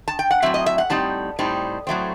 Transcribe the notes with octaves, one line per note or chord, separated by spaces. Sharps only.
A5
G5
F#5
A2 F#3 C4 E5
D#5
E5
F#5
A2 G3 C4 D#4 A5
A2 G3 C4 D#4
A2 F#3 A3 C4